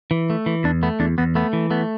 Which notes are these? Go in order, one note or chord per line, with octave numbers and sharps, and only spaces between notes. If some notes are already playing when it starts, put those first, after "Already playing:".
E3
A3
E3
E2 D4
A3 B3
E2 D4
E2 B3
A3 B3
E3
A3 B3